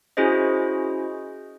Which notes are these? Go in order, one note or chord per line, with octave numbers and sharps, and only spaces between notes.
C#4 E4 F#4 G#4 C5 D#5